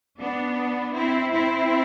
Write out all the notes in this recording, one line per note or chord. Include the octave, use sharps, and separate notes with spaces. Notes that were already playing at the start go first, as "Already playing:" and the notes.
B3 D4
C4 E4
C4 E4